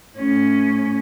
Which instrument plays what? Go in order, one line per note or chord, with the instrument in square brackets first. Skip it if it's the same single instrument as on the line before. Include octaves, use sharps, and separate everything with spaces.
[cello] A2 C#4